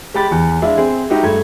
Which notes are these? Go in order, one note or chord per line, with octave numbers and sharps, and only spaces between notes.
G#3 G4 B5 A6
E2
G#3 D4 E4 E5 F5
C4 G#4
G#3 D#4 E4 F#4 G4
G2 A3 G#6